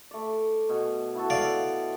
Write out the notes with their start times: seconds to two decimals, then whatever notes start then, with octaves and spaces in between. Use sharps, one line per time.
0.11 A3 D5
0.69 B2 G#5
1.15 E4 F#4 A4
1.30 D5 F5